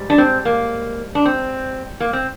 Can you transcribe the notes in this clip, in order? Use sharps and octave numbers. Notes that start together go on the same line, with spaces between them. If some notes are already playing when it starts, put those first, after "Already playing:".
Already playing: G#2 G3
D4
C4
A#3
D4
C4
A#3
C4